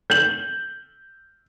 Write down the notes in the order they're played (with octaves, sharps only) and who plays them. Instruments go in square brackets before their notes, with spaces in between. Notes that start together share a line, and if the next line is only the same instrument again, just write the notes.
[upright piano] G6 F#7